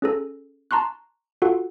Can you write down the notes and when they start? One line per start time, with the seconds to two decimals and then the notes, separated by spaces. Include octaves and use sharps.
0.02 C#4 G#4 A4
0.71 A5 A#5 C6 C#6 F#6
1.42 F4 F#4 A4 F#5